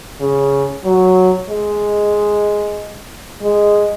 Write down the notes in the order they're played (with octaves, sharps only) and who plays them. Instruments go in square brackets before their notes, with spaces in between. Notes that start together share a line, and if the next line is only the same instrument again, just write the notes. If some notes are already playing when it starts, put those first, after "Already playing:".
[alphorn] C#3
F#3
G#3
G#3